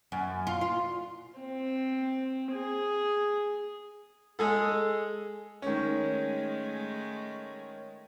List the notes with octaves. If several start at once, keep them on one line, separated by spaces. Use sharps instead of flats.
F#2
F4
F4
C4
G#4
G#3 G#4 A4
D#3 G#3 A3 C#4